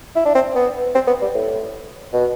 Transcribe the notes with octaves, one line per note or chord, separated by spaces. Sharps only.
E4
D4
C4
B3
C4
B3
G3
A2
B2